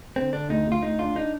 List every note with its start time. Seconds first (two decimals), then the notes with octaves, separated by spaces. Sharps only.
0.16 D3 C4
0.33 D3 D4
0.49 D2 D#4
0.67 D2
0.72 F4
0.83 D2 D#4
0.99 D4 F4
1.16 D4 D#4